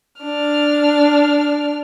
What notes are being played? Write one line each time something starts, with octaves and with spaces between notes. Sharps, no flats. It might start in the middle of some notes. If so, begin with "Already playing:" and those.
D4 F6